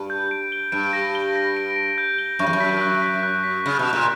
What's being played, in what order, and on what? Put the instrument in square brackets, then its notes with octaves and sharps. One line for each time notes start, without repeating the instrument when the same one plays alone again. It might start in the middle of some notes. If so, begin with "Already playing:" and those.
Already playing: [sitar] G2
[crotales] G6
D7
G7
[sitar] G2 [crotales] D7
[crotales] A#6
G7
A#6
D7
D7
G6
G7
[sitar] F#2 [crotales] C#6
[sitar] E2
F#2
[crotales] B6
F#6
B6
F#6
B6
[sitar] C#3 [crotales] C#6
[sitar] B2
[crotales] C#6
[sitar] A#2